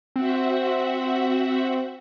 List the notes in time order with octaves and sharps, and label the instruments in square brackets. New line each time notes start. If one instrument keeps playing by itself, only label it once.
[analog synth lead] C4 [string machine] F#4 E5 F#5